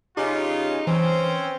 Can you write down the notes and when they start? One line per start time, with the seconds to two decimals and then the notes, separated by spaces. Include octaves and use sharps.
0.17 C#3 C#4 D#4 F4 G4
0.87 E3 C4 C#4 C5